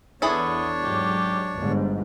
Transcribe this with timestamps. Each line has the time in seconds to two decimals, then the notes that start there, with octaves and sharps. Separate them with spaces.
0.22 E2 B3 D4 E4 G#4 A4 C#5
0.83 G#2 F#3 G4
1.55 G1 G#2